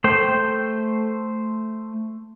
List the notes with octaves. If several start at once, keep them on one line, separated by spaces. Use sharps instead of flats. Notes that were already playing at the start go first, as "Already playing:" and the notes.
A3 C5 G5